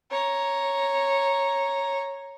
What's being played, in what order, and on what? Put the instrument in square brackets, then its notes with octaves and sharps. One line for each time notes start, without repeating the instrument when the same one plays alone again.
[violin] C#5 A#5